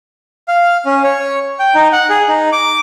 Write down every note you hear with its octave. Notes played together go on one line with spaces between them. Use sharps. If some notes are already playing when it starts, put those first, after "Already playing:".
F5
C#4
C#5
G5
D#4
F#5
G#4
D#4
D6